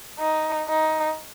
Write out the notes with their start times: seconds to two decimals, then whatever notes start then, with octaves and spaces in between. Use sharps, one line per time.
0.19 D#4
0.69 D#4